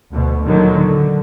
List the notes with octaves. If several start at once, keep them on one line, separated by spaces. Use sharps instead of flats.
D2 B2
A#2 D3 D#3 F#3
D3